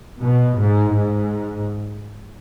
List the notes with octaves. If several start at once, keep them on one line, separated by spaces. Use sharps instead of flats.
B2
G#2
G#2